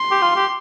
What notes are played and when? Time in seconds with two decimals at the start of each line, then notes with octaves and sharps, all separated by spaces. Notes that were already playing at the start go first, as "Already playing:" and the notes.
Already playing: C6
0.11 G4
0.22 F4
0.36 G4